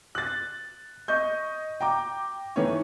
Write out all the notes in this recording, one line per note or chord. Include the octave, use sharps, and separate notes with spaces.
F#6 A6
D#5 C#6 G6
G5 A#5 D6
D#3 E3 A4 B4 C#5